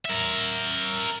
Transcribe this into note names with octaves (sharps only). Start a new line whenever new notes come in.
A#4 E5